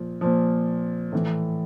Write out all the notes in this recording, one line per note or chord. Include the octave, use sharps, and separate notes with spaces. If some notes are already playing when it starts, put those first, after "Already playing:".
Already playing: A#2 F3
A#2 F3
A2 E3